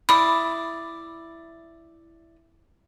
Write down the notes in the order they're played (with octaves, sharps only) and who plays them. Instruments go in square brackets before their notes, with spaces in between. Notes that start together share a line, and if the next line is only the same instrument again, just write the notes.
[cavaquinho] E4 D5 D#6 [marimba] B5